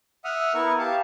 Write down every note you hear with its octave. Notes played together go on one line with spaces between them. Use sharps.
E5 F#5 D#6 F6
B3 E4 A#4 C#6
G4 F5 A5